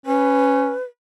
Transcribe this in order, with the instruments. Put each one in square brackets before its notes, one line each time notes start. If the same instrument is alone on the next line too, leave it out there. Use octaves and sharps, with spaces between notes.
[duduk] C#4 [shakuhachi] B4